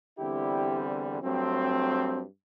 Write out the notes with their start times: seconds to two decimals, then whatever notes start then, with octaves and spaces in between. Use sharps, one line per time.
0.18 E2 D3 G3 C4 E4 G4
1.22 G2 F#3 A3 C4